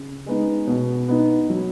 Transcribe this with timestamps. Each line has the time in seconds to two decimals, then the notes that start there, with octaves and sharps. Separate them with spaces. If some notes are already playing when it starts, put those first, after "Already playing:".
Already playing: C#3
0.26 G#3 B3 D#4
0.67 B2
1.08 B3 D#4
1.50 F#3